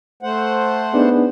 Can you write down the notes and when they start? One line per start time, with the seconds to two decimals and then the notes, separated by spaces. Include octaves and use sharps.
0.23 A3 C5 F#5
0.94 B3 D4 D#4 G#4